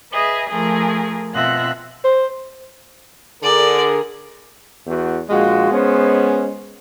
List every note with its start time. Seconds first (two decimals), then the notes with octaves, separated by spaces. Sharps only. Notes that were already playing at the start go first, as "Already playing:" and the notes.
0.12 G#4 B4 D#5 E5
0.49 F3 A3 G#4 A#4
1.33 B2 C4 F4 E5 F#6 A#6
2.04 C5
3.43 D3 G#4 A#4 D5
4.87 E2 E3 F#4
5.29 A#1 G#3 F4 F#4
5.71 B3 C#4 C5